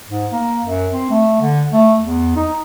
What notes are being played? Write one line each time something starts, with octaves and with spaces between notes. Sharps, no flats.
G#2
A#3
F#2
C4
A3
D3
A3
E2
D#4